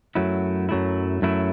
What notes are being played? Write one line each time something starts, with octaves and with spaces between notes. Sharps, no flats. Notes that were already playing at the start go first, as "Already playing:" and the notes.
F#2 F#3 A3 E4
F#2 F#3 A3 E4
F#2 F#3 A3 E4